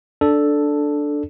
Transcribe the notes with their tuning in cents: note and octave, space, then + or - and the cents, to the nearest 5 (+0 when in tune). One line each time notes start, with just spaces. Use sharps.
D4 +0 A4 +0 D5 +0